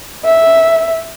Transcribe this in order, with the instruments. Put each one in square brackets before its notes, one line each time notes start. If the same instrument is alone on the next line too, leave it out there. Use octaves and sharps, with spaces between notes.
[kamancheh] E5